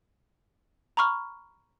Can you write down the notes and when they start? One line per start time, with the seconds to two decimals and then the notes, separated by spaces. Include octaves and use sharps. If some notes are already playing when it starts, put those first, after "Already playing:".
0.97 A#5 B5 C#6 F6